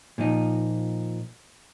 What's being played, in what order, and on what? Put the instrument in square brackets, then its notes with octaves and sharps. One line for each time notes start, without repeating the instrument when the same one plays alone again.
[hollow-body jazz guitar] A#2 F3 D#4